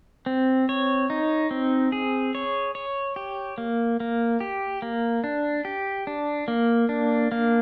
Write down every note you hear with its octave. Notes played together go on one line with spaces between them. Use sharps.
C4
C#5
D#4
C4
G#4
C#5
C#5
G4
A#3
A#3
G4
A#3
D4
G4
D4
A#3
D4
A#3